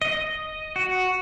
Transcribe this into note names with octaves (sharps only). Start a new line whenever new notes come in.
D#5
F#4